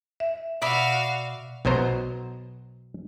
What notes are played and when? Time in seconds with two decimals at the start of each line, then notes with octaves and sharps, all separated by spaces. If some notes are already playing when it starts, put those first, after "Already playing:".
0.20 E5
0.62 B2 F#4 D5 E5 F5 B5
1.65 B1 B2 F#3 C5 A#5